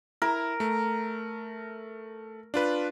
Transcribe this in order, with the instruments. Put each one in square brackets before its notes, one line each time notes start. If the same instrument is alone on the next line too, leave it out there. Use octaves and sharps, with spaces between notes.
[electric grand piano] E4 [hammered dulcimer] A#4
[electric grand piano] A3
D4 F4 B4